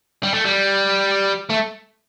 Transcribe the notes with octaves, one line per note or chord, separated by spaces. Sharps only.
G3
A3
G3
A3